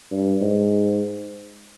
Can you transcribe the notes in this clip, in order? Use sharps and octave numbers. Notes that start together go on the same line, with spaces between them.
G2
G#2